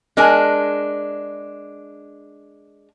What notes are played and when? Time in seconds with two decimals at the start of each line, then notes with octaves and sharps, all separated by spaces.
0.17 G#3 D4 A#4 G#5